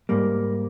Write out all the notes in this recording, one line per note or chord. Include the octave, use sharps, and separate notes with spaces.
G#2 G3 A#3